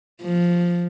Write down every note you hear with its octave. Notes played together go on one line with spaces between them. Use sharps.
F3